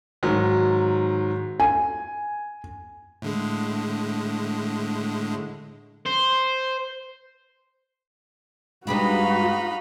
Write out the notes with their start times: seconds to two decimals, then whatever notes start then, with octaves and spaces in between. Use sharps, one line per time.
0.23 G#2 D#3 F#3
1.60 G#5
3.22 A2 D3 G#3
6.06 C5
8.87 G2 G#3 D#4 F#4 G4 B4 F5 B5